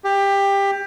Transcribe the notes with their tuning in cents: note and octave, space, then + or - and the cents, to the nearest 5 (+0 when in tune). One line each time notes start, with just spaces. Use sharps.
G4 +15